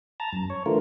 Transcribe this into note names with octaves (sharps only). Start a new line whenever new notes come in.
A5 A#5
F#2
C#5
D3 E3 A3 F4 A#4